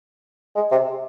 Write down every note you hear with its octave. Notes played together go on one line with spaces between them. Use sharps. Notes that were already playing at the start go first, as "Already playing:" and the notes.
G#3
C3